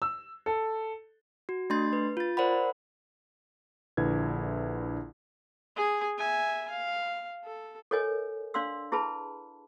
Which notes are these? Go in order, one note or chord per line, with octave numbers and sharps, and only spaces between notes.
E6
A4
F#4
A3 D4 C6 A6
B4
F4 A6
A#4 C5 D5 F#5 B5
A#1 D3 E4 B4 G#6
G#4 G#5
E5 G#5
F5
A4
A4 A#4 C#5 D#5 G#5
D4 D5 F5 C6 E6
E4 G#4 B4 A5 B5